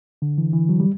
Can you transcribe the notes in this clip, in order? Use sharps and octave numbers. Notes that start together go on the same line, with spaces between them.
D3
E3
E3
F#3
G3